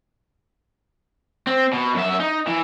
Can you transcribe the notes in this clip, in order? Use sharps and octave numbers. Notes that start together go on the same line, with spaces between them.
C4
B2
F#2 E5
D#4
E3